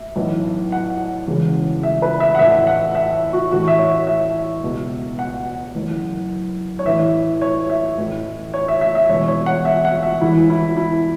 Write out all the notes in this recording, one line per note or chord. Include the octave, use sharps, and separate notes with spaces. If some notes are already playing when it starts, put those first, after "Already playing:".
Already playing: E5
B1 A2 E3
F#5
E1 E2 C#3 E3
E5
B4
E5
F#5
A1 A2 E3 E5
F#5
E5
F#4
A1 A2 E3 F#4
E5
C#5
E5
C#2 B2
F#5
F#1 F#2 E3
C#5
A1 A2 E3 E5
C#5
E5
A1 A2 E3
C#5
E5
E5
E5
E1 E2 B2 C#5
C#5
F#5
E5
F#5
E5
E1 E2 E3 E4
E4
E4